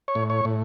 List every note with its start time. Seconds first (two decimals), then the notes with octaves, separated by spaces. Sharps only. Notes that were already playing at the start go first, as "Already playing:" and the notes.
0.08 C#5
0.15 A2
0.30 C#5
0.45 A2